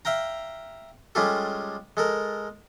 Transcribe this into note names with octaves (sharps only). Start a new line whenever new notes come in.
E5 F5 G5 A#5
G3 G#3 C#4 F4 G4 A4
G#3 A4 A#4